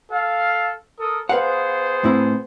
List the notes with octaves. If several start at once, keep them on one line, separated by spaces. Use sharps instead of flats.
A4 F5
A4 A#4 D#6
B3 G#4 B4 C5 F5 F#5
A2 C4 E4